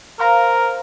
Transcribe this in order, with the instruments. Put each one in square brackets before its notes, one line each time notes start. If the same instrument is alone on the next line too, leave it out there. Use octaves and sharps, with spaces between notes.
[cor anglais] A#4 [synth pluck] C5 F5 A#5